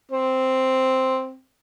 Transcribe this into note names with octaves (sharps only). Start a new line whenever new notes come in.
C4